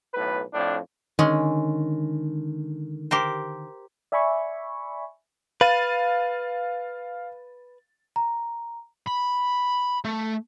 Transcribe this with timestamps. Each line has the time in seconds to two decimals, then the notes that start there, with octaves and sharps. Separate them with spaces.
0.14 B1 A2 B4
0.54 F2 A2 D4
1.19 D3 D#3 G#3 C#4
3.11 G4 A#4 C5
4.12 D5 E5 G#5 B5 C#6
5.61 B4 F5 A6 D#7
8.16 A#5
9.07 B5
10.05 A3